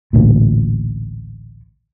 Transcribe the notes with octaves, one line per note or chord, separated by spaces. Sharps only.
A1 D2 A#2